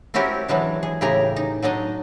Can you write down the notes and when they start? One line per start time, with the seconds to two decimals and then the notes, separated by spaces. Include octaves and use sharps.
0.14 C4 C#4 E4 F#4 G4 A#4
0.48 E3 F#3 G#3 D4
0.83 G#4
1.01 A2 C#3 G4 G#4 A#4 A#5
1.36 D#4
1.63 F#3 D4 D#4 D#5